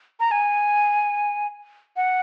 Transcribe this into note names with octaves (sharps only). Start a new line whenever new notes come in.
A#5
G#5
F#5